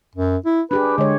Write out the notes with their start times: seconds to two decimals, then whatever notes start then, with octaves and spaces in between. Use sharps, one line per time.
0.16 F#2
0.45 E4
0.71 D4 G4 G#4 B4
0.98 D3 G#3 C#5